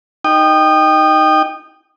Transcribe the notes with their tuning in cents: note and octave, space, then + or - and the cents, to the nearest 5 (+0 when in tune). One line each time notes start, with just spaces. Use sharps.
D#4 +0 G5 +0 D#6 -25